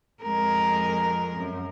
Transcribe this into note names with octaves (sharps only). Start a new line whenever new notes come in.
F2 G#3 A#4
F#2